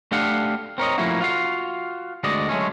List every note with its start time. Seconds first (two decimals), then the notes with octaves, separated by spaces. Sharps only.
0.12 A3 D4 G4 A4 F5 F#5
0.78 C4 A#4 C#5 D#5
0.98 F3 A3 A#3 C#4 E4 F#4
1.21 F4 F#4 F5
2.24 D2 G#3 F#4 D5 D#5
2.49 F#3 G#3 A3 C#4